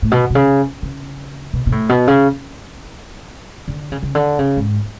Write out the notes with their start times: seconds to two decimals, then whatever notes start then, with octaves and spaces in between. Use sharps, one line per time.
0.02 A2
0.11 B2
0.30 B2
0.35 C#3
0.82 C#3
1.53 B2
1.67 B2
1.72 A2
1.89 B2
2.07 C#3
3.68 D3
3.92 C#3
4.03 C#3
4.15 D3
4.39 C#3
4.57 G#2